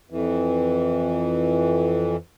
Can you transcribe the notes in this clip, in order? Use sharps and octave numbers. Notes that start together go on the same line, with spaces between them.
F2 E3